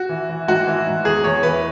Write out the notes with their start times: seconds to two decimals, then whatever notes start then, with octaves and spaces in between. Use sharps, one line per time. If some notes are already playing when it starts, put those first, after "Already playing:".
Already playing: F#4
0.09 E3
0.29 E3
0.48 G#2 F#4
0.67 E3
0.86 G#2
1.05 E2 G#4
1.24 E2 C#5
1.43 E3 B4